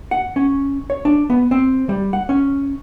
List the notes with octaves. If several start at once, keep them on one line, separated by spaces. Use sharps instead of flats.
F#5
C#4
C#5
D4
B3
C4
G3
F#5
C#4